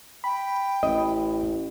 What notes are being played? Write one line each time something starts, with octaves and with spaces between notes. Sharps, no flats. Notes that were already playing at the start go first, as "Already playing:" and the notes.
G5 B5
A1 D#5